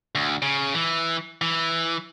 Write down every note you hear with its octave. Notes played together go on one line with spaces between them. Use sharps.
D2
C#3
E3
E3